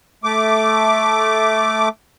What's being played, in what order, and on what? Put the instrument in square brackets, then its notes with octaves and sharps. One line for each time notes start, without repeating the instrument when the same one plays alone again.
[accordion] A3 D6